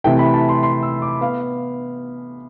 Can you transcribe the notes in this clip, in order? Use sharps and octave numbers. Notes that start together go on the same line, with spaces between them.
C3 E3 A3 G5
B5
A5
C6
C6
E6
D6
B3 F5